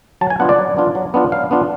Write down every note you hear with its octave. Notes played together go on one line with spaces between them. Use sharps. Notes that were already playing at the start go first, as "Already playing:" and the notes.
F#3 A5
G#5
B3 D4 F4 F#5
D5
F#3
B3 D4 F4
F#3
B3 D4 F4
F#3 F5
B3 D4 F4